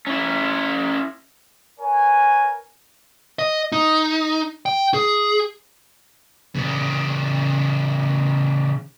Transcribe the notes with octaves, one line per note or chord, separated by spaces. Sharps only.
C#4 E4
A#4 B4 C#5 G#5
D#5
D#4
G5
G#4
C#3 E3